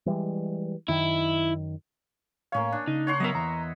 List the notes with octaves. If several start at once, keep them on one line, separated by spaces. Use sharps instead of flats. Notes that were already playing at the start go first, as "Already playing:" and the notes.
E3 G3 G#3
F#2 D#3 E4
A2 A#3 C#4 C#5 F5
D4
C#3 D#4
C#5 F#5 C6
F#3 B3 A#4 D#5 E5
E2 A#5